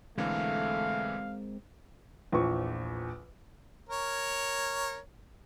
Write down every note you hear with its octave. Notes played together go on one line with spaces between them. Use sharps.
B1 D3 E3 G#3 A3 C4 A#4 F5
A#1 E2 F3 C#6
A#4 C#5